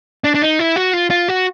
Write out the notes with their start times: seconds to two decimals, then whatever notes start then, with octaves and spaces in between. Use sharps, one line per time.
0.24 D4
0.34 D4
0.42 D#4
0.59 E4
0.76 F#4
0.93 F4
1.10 F4
1.28 F#4